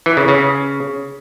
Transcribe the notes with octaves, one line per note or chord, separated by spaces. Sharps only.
E3
C#3
C#3